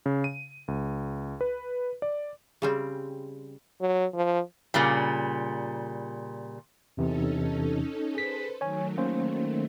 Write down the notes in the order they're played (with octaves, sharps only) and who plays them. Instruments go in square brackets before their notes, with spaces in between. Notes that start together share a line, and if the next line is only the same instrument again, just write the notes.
[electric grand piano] C#3
D#7
C#2
B4
D5
[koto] C#3 G3 C4
[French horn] F#3
F3
[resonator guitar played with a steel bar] A#2 C#3 G3
[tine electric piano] E2 C3 E3 [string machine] C#4 D#4 A4
[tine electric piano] G#4 B6 [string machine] A4 B4 C5
[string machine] D#3 F#3 A3 [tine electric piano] C#5 G#5
[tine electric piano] A#3 C#4 C5